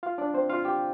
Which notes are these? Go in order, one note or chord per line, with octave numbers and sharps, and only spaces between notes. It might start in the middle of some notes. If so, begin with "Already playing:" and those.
F4 F5
D4 D5
C4 C5
F4 F5
G4 G5